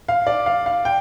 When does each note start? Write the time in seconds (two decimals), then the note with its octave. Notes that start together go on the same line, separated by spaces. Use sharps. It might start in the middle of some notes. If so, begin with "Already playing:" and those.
0.08 F5
0.27 D5
0.46 F5
0.66 F5
0.85 G5